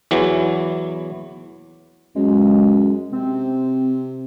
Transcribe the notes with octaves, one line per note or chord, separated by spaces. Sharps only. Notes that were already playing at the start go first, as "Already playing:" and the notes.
E2 E3 F#3
F#2 G#3
C3 C4